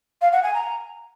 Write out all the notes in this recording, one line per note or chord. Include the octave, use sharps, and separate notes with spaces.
F5
F#5
G#5
A#5